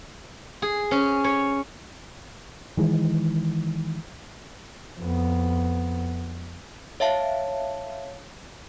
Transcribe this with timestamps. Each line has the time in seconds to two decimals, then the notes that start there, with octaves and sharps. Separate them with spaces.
0.62 G#4
0.91 C#4
1.24 C#5
2.77 D#3 E3 G#3
4.98 F2 B3
7.00 C#5 E5 F5 A5